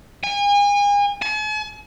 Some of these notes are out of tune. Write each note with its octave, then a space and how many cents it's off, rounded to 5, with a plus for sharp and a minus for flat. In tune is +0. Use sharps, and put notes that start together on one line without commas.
G#5 -35
G#5 +45